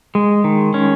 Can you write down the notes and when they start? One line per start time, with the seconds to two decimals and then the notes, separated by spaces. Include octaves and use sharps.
0.15 G#3
0.44 D#3
0.74 C#4